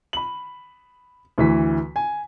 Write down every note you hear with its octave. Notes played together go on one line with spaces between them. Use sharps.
B5 F#7
D2 E3 B6
G#5